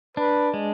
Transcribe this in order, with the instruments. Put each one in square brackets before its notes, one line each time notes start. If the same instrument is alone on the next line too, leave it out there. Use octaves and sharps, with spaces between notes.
[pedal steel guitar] D4 [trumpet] B4
[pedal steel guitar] G#3